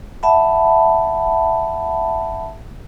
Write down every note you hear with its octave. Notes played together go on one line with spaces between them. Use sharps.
E5 F#5 A5 B5